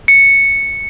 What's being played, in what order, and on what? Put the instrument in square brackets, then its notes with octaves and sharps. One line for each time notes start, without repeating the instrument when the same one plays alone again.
[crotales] C#7